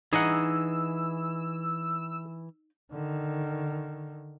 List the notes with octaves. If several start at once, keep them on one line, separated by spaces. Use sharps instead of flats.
E3 D#4 G#4 D#5 F#5 E6
D3 D#3